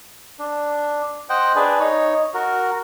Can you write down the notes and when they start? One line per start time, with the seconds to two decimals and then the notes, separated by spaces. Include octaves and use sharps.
0.39 D4
1.29 C5 D#5 F#5 G5
1.56 D4 G#4 B4 D5
1.80 D#4 C#5
2.34 F#4 A#4